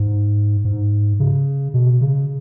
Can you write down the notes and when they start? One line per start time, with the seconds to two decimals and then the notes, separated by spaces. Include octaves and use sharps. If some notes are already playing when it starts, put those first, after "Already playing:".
Already playing: G#2
0.65 G#2
1.20 C#3
1.74 B2
2.01 C#3